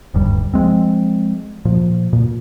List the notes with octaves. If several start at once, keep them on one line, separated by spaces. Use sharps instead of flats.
D#1 D2 G2 G3
F3 G#3 C4
A#2 F3
A#2